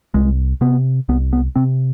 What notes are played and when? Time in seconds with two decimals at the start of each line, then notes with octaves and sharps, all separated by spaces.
0.14 C2 G#3
0.61 C3 B3
1.09 C2 B3
1.33 B3
1.56 C3 C4